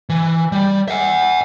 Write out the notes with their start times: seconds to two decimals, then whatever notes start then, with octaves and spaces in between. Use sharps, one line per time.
0.09 E3
0.52 G3
0.88 E5 F#5